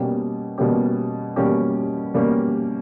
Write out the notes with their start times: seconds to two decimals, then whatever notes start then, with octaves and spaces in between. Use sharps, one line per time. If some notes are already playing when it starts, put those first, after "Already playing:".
Already playing: B2 G3 A#3 C#4 G4
0.58 B2 G3 A#3 C#4 G4
1.36 B2 G3 A#3 C#4 G4
2.14 B2 G3 A#3 C#4 G4